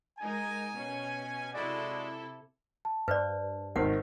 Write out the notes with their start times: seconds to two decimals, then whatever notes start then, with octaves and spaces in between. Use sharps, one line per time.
0.19 G#3 D#4 A#4 G#5
0.74 B2 C#4
1.53 C3 G#3 E4 F#4 A4 D5
2.85 A5
3.08 G2 B4 C5 D5
3.76 G#1 D#3 A#4 C5 F#5